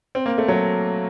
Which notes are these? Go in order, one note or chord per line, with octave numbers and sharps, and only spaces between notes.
C4
A#3
A3
F#3